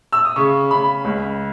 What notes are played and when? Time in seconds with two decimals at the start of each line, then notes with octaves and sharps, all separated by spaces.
0.13 E6
0.25 D#6
0.36 C#3 C#6
0.71 C#3 B5
1.05 C#2